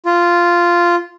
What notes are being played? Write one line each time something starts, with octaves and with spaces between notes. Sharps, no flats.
F4